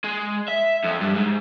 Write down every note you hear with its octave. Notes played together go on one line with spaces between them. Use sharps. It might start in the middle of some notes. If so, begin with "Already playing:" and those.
G#3
E5
F2
G2
G#2